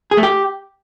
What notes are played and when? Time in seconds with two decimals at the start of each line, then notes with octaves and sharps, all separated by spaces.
0.11 G#4
0.17 A3
0.23 G4